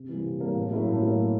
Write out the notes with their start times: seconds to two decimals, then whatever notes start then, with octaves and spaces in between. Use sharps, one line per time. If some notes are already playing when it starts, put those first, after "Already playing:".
Already playing: C3
0.09 E3 G3 A#3
0.25 C3
0.40 E3 G3 A#3
0.55 A2
0.70 F#3 A#3 C#4 E4
0.87 A2
1.02 F#3 A#3 C#4 E4